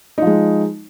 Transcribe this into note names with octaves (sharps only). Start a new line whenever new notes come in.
F3 G#3 D#4